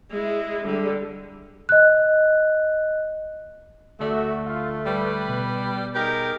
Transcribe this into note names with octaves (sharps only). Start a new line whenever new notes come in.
G#3 E4
D3 G3
D#5 F#6
D2 A3 F#4 A4 D5 E5
F4
G3 B4
B2
D#4 G4 G#4 A#4